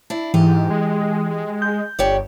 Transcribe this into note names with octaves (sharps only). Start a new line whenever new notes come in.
D4 E4
G#2 E3 G4
G#3
G6
G1 G4 C#5 D5